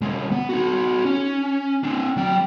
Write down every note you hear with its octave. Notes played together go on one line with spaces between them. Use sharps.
C2 G#3
B3
D#4 F#4
C#4
C4 D4
F#3 G5